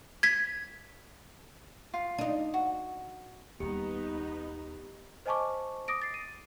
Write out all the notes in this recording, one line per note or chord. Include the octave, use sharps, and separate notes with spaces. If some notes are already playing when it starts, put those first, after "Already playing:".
G#6 B6
F4
D4 D#4
F#4
D#2 G3 B3 D#4 G4
C5 D#5 G#5 A5 C#6 D6
D6 D#6 A#6 D7
A6 C7
D#7